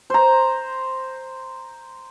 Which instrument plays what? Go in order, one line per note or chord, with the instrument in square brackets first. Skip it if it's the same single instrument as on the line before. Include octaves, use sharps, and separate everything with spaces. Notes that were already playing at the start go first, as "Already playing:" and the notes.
[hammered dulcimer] C5 A#5